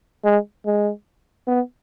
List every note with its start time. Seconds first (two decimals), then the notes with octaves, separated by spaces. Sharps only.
0.25 G#3
0.66 G#3
1.47 B3